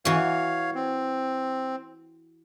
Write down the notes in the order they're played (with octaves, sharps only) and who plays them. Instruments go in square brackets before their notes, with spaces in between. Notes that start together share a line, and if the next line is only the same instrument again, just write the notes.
[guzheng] E3 F#4 [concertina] C#5 F5
[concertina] C4